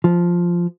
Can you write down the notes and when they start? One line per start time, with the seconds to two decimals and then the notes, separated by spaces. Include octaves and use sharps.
0.04 F3